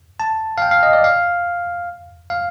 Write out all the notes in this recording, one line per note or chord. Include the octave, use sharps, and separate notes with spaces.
A5
F5
G5
F5
D#5
D5
F5
F5